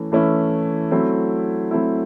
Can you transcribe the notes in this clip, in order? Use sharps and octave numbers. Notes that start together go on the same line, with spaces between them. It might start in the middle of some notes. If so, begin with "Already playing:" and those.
Already playing: E3 A3 C#4 E4
E3 A3 C#4 E4
F#3 A3 C4 E4
F#3 A3 C4 E4